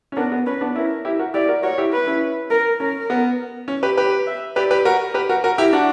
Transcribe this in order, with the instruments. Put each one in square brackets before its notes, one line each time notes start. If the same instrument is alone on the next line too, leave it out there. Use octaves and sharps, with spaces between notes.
[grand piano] C#4
[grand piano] B3 D4 [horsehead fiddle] A#4
[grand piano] B3
[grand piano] C#4 [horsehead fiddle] B4
[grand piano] B3 D4
[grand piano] C#4 E4 [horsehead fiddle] A#4
[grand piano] E4 G4
F#4 A#4
[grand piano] E4 G4 [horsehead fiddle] D5
[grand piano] F#4 A#4
[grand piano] F#4 A#4 [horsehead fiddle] C#5
[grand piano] E4 G4
[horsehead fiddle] B4
[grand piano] C#4 E4
[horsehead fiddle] A#4
[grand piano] C#4 [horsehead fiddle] A#4
[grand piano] B3
C#4
G4 B4
G4 B4
[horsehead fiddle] E5
[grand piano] G4 B4 [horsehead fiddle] D5
[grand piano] G4 B4
F#4 A#4
G4 B4
F#4 A#4
F#4 A#4
E4 G4
D4 F#4